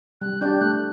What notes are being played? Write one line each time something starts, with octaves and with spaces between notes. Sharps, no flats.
G3 F#6
D4 G4 D5 G6
A3 F#6
F#6